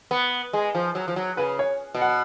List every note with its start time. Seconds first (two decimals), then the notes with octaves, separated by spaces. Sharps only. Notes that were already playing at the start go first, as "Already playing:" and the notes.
0.11 B3
0.53 G#3
0.75 F3
0.95 F#3
1.08 F3
1.16 F#3
1.37 C#3 B4
1.59 C#5
1.95 B2
2.01 F#5